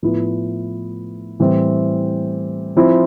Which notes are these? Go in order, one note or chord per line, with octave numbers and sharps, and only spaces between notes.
A2 F3 B3 E4
A2 E3 G3 C4
F3 C4 E4